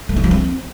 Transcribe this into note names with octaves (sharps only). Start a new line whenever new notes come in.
A3
E4
F3
C4